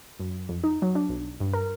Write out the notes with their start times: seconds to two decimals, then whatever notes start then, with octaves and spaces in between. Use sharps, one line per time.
0.20 F#2
0.49 F2
0.64 D#4
0.82 F#3
0.95 D4
1.09 B1
1.40 G2
1.53 A#4